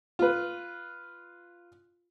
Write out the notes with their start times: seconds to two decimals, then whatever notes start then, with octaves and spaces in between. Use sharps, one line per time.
0.19 F4 B4